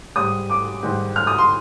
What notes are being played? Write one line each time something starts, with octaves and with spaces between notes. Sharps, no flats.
G#2 G3 D#6
D6
G#2 D#3 G3
F6
D#6
C6